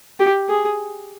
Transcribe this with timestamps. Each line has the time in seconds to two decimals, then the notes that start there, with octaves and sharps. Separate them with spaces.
0.19 G4
0.49 G#4